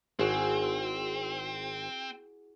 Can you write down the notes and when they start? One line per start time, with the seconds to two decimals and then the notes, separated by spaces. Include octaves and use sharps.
0.19 G#1 C4 E4 F#4 G#4